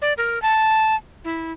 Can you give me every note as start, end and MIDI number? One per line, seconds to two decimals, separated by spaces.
0.02 0.13 74
0.18 0.41 70
0.42 0.95 81
1.25 1.52 64